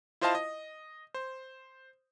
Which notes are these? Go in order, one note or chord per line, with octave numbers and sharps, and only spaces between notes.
E4 F4 C5 D#5 F5 A5
D#5
C5